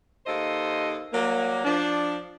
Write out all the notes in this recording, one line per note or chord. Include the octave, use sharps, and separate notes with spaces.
D#2 A#3 A4 C5 D#5
F#3 G3 A#3
F3 D4